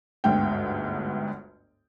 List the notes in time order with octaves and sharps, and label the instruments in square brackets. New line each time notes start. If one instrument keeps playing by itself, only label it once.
[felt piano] G1 D2 G#2 G5